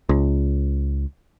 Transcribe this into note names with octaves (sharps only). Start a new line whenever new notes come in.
C#2